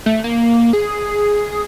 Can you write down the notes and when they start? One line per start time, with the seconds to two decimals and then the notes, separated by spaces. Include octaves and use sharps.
0.06 A3
0.24 A#3
0.73 G#4